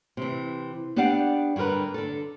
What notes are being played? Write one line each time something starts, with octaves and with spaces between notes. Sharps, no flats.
C3 E3
B3 D4 G4 D5 F5 F#5
G2 D3 F#4 A#4 B4
D3 A4